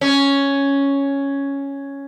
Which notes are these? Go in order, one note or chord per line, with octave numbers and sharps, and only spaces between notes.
C#4